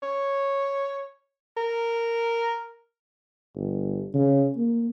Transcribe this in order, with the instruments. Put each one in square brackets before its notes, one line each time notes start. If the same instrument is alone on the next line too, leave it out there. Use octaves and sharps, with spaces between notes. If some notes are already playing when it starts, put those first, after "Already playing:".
[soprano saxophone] C#5
A#4
[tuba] G1
C#3
A#3